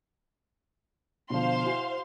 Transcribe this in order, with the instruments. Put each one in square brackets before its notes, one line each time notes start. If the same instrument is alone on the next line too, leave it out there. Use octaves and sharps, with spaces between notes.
[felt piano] B2 D3 F3 [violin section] C5 F5 C6
[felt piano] E4 F#4 G#5